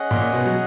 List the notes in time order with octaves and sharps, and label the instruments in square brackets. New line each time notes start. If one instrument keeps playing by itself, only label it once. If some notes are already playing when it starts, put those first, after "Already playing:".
Already playing: [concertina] C#4 G#4 D#5 F#5
[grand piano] A#2
B2
F#3